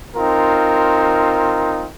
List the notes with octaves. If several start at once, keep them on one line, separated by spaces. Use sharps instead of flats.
C4 D#4 F4 A#4